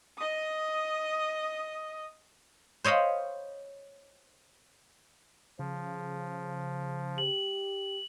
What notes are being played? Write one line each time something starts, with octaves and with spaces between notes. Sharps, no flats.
D#5 D#6
C5 C#5 D#5 F5 B5
C#3 F3
G4 F#7